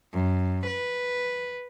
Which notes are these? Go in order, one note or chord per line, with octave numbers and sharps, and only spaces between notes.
F#2
B4